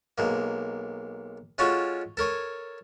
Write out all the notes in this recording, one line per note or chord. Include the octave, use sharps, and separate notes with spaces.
B1 G#3 A#3
G#3 C#4 F4 F#4 A4 C#5
A4 A#4 C#5 G#5